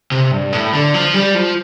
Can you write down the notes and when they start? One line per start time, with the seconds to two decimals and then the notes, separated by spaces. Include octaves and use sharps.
0.12 C3
0.31 G2
0.52 A2
0.73 D3
0.94 F3
1.14 G3
1.35 F3